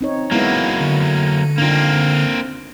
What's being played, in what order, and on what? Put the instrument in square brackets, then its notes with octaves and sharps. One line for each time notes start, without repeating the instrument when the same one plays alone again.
[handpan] C4 D#4 C#5
[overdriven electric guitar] F#3 A#3 [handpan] G#3 B3 E4
[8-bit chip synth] D3
[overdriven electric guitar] A#3 C4 [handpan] D4 D#4 F4